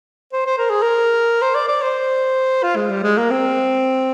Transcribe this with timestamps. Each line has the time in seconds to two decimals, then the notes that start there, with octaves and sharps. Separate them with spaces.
0.33 C5
0.46 C5
0.58 A#4
0.70 G#4
0.82 A#4
1.41 C5
1.55 D5
1.68 D5
1.82 C5
2.63 F4
2.76 G#3
2.90 G3
3.03 G#3
3.18 A#3
3.31 C4